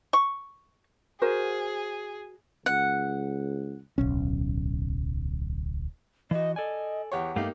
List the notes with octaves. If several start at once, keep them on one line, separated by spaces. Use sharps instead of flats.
C#6
F#4 G#4 A#4 C5
C#2 F#5
D1 B1 C#4
E3 F#4 D#5
A4 D5 D#5 G#5
E2 G4 C#5 F#5
G2 A3 A#3 D#4 G4 F5